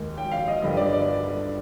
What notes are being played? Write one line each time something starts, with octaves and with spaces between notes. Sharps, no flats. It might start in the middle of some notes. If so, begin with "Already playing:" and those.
Already playing: D#2 D#3 G#3
G5
F5
D#5
G1 G2 D3 G3 D#5
D5
D5